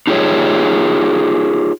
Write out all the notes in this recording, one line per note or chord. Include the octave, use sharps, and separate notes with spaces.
D#4 F4 G4 G#4 C#5